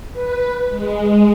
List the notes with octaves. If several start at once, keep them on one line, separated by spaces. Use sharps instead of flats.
B4
G#3